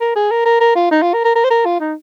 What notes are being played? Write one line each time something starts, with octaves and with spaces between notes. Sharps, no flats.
A#4
G#4
A#4
A#4
A#4
F4
D#4
F4
A#4
A#4
A#4
C5
A#4
F4
D#4